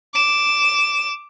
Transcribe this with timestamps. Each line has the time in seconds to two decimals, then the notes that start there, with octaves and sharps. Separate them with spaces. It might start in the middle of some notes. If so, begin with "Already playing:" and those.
0.14 D6 E7